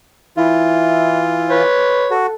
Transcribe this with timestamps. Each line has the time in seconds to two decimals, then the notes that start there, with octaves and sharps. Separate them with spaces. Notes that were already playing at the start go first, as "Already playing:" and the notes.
0.37 E3 E4 F4
1.50 B4 C#5
2.10 F#4 A4